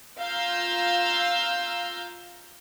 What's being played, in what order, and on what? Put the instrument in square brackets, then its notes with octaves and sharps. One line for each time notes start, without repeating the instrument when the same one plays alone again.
[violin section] F4 F5 A#5 E6 F6 G6